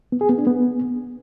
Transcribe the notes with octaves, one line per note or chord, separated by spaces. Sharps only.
B3
G#4
B3
D4
B3